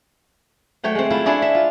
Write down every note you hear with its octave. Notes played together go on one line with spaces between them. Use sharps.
F#3 A3 C#5 G5
G#3 C4
F#3 A3 E4 F4
D4 E4 G#4 C#5 D5
E5
F4